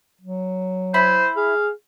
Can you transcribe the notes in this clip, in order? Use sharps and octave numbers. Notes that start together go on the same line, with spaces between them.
F#3
E4 C5 B5
G#4 F5